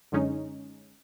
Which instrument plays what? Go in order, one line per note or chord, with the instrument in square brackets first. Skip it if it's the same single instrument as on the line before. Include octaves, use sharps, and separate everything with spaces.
[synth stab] F#2 D3 G#3 C#4 D#4